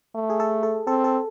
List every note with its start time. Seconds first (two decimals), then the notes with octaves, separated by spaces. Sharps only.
0.15 A3
0.30 G#4
0.40 A4
0.63 A4
0.87 C4 A4
1.04 A4